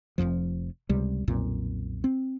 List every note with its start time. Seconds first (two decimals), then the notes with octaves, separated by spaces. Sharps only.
0.18 F1 C2 F2 F3
0.89 C#2 C3 G3
1.28 B1 F2 A#2
2.04 C4